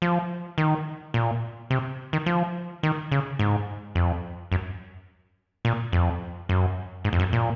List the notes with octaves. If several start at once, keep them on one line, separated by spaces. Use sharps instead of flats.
F3
D#3
A#2
C3
D#3
F3
D#3
C#3
G#2
F2
F#2
A#2
F2
F#2
G#2
F2
F#2
A#2